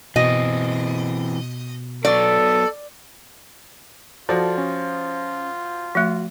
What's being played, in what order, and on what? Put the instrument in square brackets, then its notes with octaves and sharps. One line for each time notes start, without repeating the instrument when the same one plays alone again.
[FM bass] B2 [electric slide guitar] E3 C4 [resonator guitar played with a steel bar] D#5
[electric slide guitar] F#3 B3 [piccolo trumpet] A4 [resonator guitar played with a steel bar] D5
[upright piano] F3 F#4 [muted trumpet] F4 [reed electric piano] A4 D5 A5
[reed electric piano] C#4
[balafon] F3 A3 [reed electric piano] F#4